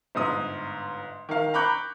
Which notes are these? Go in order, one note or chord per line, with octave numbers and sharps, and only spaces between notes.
G1 G#2 D#6
D#3 F5
A#5 B5 C#6 D6 F#6 G6